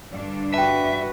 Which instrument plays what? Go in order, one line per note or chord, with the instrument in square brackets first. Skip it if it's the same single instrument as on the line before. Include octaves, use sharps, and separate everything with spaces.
[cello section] G2 D3 D4
[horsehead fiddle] F#4 B4 [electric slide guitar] E5 [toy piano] G5 A5